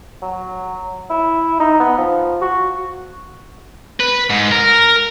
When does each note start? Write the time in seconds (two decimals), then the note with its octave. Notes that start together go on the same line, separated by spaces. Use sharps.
0.23 F#3
1.10 E4
1.60 D#4
1.80 B3
1.98 F3
2.41 F#4
4.00 B4
4.30 G#2
4.51 A#4